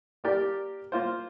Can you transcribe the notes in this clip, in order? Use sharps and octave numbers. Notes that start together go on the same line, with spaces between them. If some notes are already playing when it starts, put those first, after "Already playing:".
A#3 G4 A#4 D5
A#3 F4 C5